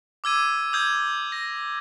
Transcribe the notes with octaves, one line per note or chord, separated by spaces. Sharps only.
D6 E6 G#6 D#7
D#6 G6 G#6
A#6